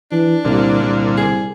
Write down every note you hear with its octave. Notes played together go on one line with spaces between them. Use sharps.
E3 D4
C2 A#2 D3
C2
G#4